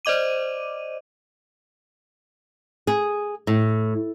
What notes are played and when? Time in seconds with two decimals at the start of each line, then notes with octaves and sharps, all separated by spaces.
0.05 C5 D5 D#5 D6 D#7
2.87 G#4
3.47 A2